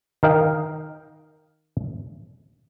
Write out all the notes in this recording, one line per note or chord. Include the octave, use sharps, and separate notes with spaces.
D#3 A#4 D#5 F5 G5